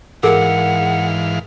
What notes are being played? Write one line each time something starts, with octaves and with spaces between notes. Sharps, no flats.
G#2 E3 G#4 A#4 F5 F#5